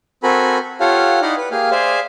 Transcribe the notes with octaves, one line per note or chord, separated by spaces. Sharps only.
C4 F#4 A4 A#4 G#5 B5
F4 G4 A4 C#5 F5 F#5
D#4 E4 D5 D#5 F5 F#5
B4
A#3 G4 G#4 F5
G#4 C5 D5 E5 F5